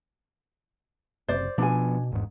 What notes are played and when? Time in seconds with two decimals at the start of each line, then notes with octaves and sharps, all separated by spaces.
1.28 F#1 C3 C5 D5
1.58 B2 F3 B3 D4 G#5
2.12 G#1 E2 G#2